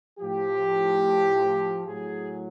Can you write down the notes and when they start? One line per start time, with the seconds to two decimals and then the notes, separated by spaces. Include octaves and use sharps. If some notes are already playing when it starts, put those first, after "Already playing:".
0.18 A2 F3 G4
1.86 A2 F#3 G#4